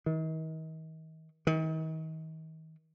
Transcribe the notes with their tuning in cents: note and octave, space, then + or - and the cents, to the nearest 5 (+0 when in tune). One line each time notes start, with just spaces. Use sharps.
D#3 +40
D#3 +40